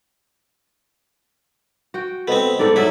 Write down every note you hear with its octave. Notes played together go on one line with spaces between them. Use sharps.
F#4 G5
B3 C4 A4 C5 D#5
G#2 G3 D#4 A4 D5
F#3 B3 E4